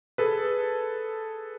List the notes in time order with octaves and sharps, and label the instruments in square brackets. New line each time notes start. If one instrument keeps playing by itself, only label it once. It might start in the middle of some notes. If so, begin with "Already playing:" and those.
[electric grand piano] G#4 A4 B4